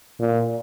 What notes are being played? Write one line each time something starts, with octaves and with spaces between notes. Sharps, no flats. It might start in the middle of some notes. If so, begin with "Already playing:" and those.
A#2